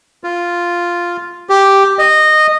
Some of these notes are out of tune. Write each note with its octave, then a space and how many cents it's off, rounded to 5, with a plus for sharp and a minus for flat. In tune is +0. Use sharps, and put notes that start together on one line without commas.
F4 -5
G4 +0
D#5 -15